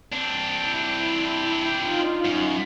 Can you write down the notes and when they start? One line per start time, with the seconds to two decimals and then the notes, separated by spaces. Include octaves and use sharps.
0.12 C4 D4
0.69 E4
1.84 D#4 F4
2.25 F#2